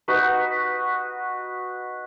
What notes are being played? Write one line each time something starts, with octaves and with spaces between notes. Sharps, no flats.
D#4 F#4 B4